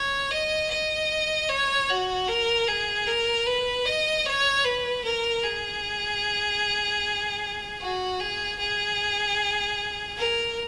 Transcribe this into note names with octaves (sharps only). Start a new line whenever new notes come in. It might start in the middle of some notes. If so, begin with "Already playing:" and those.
Already playing: C#5
D#5
D#5
C#5
F#4
A#4
G#4
A#4
B4
D#5
C#5
B4
A#4
G#4
F#4
G#4
G#4
A#4